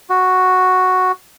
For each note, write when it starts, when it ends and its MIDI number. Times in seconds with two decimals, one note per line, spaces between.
0.10 1.12 66